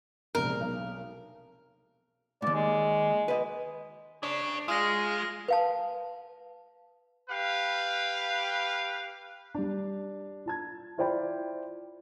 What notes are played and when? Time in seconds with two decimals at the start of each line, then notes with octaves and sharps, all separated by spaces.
0.35 E1 A#1 C3 A#4
0.60 B1
2.42 D#2 G#2 D5
2.54 G#3
3.28 B4 D#5
4.23 D4 G#4 C#5
4.68 G#3 F4 G#4 D#6 F6 A#6
5.48 B4 F5 A5
7.30 G4 B4 F5
9.55 G3 D4
10.46 F4 A5 G#6
10.98 E4 F4 C5 D5 G5 B5